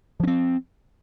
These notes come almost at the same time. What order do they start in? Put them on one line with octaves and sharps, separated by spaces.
F3 C#4 C4